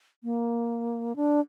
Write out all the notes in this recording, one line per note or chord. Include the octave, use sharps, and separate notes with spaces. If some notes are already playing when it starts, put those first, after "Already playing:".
A#3
D4